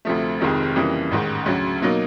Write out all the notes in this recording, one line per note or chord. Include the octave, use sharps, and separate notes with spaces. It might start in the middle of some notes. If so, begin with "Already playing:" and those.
D2 C3 F3 A3
F1 F2 C3 D#3 G#3
F2 C#3 E3 G3 A#3
A1 G#2 D#3
D2 C#3 F#3
B2 F#3 A#3 D#4